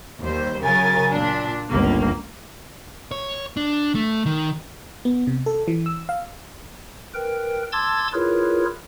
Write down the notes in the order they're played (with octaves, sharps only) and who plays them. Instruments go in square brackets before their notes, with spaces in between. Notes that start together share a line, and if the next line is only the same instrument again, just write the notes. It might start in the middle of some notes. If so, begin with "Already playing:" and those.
[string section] D#2 G3 C5
C#3 F#3 A#4 G#5 A6
A#2 D4
G1 C#2 A#3
[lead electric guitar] C#5
D4
A3
D#3
[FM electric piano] B3
C3
A4
E3
E6
F5
[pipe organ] A#4 B4 G5
A5 C6 D6 E6 G#6 A6
E4 F4 G#4 A#4 B4 C#5